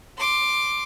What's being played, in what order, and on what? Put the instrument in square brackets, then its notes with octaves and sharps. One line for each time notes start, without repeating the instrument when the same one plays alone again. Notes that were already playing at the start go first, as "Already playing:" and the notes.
[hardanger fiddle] C6 D6